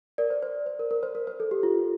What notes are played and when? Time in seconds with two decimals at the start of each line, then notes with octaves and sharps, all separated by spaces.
0.18 A#4 D5
0.30 C5
0.43 C5
0.66 C5
0.79 A#4
0.91 A#4
1.03 C5
1.15 A#4
1.27 C5
1.40 A4
1.51 G4
1.63 F4